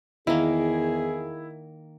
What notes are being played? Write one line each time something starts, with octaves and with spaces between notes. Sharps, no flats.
E2 D#3 A#3 E4 G#4